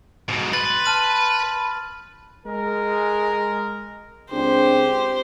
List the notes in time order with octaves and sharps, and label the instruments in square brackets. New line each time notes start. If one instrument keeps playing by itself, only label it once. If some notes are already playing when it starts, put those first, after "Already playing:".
[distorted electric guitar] G#2 B2
[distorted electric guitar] B4 [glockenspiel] C6 A6
[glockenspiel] A5 F6 D#7
[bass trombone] G#3 [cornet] A#4
[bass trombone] C#2 [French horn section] C4 D4 G#4 [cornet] G4 [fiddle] C5